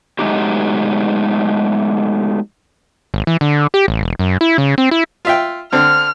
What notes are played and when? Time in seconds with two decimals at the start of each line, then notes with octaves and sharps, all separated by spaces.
0.19 F#3 G#3 A3 B3 D#4 G4
3.14 G#1
3.27 E3
3.41 D3
3.74 G4
3.88 A1
4.02 E1
4.19 F#2
4.41 E4
4.58 C#3
4.78 C4
4.91 E4
5.25 F4 E5 G5
5.72 D3 C4 F6